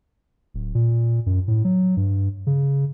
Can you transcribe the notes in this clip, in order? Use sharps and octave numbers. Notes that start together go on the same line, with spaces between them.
D1
A#2
F#2
A2
F#3
G2
C#3